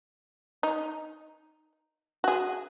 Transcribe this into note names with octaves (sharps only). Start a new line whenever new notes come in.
D#4
F#4 G#4